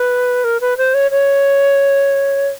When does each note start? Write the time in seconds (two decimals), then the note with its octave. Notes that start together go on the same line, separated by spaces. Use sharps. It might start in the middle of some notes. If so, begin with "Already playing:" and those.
Already playing: B4
0.44 A#4
0.61 B4
0.77 C5
0.94 C#5
1.11 C#5